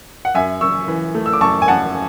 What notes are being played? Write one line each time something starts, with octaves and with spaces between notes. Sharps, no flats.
F#5
F#2 E5 G#5
F#2 C#6 E6
E3
A3
E6
D6
F#2 A5 C#6
G#5
F#2 F#5 A5